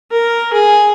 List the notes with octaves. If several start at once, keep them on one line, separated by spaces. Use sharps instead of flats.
A#4
G#4